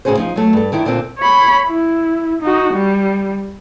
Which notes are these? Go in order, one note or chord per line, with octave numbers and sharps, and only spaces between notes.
A2 C#3 C#4 F#4 G#4 C5
F3 D#4
F#3 A3
G2 A4
D3 D#3 E4
A#2 D3 A#3 C4 F4
C#5 B5
E4
D#4 F#4
G3